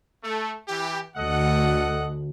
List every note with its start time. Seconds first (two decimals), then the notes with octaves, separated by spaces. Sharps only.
0.23 A3
0.68 E3 G4
1.17 D2 A4 D#5 F#5